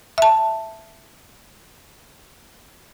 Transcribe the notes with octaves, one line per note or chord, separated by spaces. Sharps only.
E5 A5